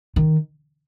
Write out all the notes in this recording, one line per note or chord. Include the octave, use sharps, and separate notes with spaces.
D#3